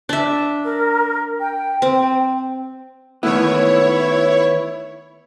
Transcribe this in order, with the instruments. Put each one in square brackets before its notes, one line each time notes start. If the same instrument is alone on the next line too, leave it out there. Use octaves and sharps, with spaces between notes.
[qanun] D4 E5
[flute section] A#4
G5
[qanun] C4
[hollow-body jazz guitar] D#3 A3 B3 [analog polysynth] E4 C#5